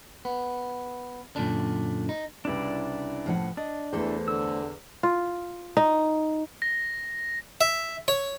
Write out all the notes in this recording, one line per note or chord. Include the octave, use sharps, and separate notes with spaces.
B3
F#2 A#2 D3 D4
D#4
C2 C#3 D4 E4 B4 D5
A2 F3 F#5
D4 D#5
E2 E3 A3 A4 B4 C5
D3 E6
F4
D#4
A#6
E5
C#5